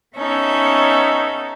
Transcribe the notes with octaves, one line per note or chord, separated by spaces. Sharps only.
B3 C#4 D#4 A4 E5